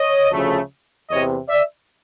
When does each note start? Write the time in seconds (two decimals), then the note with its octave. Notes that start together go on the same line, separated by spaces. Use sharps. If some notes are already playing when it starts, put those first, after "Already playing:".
Already playing: C#5 D#5
0.31 D2 C#3 F3 A3
1.10 E2 C3 E3 C#5 D#5
1.49 D5 E5